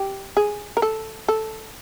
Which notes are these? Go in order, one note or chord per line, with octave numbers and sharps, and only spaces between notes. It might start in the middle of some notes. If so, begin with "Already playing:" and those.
Already playing: G4
G#4
A#4
A4
A4